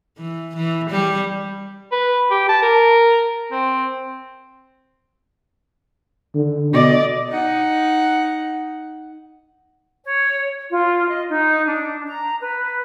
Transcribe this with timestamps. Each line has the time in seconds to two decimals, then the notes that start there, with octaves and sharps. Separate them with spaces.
0.18 E3
0.56 E3
0.90 G3
1.92 B4
2.31 G4
2.49 A5
2.62 A#4
3.52 C4
6.35 D3
6.73 B2 D5 D#5
7.30 D#4 F#5
10.05 C#5
10.71 F4
11.09 D#5
11.31 D#4
11.66 D4
12.08 A#5
12.40 B4